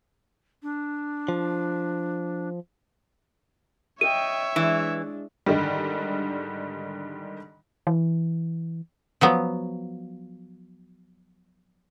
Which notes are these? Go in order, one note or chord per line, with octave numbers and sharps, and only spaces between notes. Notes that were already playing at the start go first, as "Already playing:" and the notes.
D4
F3
C#5 D#5 E5 G5 D#7
E3 G#3 D4
G#2 D3 D#3 G3
E3
F3 F#3 B3